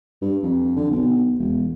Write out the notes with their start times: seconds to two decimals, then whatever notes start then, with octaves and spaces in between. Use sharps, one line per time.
0.22 G2
0.43 F2
0.76 D3
0.91 B1
1.39 E1